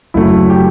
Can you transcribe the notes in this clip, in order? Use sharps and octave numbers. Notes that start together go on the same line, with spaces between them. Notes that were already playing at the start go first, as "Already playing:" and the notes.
F#1 F#2 F#3 A3 E4
G4